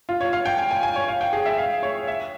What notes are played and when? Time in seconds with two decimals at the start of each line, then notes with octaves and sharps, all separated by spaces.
0.09 F4
0.21 C#5
0.33 F5
0.46 G5
0.58 G#5
0.71 G#5
0.83 G#5
0.96 C#5
1.08 F5
1.21 G5
1.33 G#4
1.46 E5
1.58 F5
1.83 C#5
2.07 E5